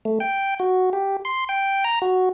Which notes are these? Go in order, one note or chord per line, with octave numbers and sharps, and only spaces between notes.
A3
G5
F#4
G4
C6
G5
A#5
F#4